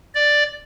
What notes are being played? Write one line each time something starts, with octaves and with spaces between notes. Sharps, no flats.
D5